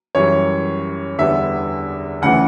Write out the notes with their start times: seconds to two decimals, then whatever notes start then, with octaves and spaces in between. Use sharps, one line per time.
0.15 F#2 E3 G3 C#5
1.19 E2 D3 G3 B3 E5
2.22 D2 C#3 E3 F#5